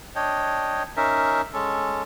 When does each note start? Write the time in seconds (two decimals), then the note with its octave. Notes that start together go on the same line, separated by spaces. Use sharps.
0.15 D4 C#5 D#5 G5
0.97 C#4 D#4 A#4 E5
1.53 G#3 C#4 A4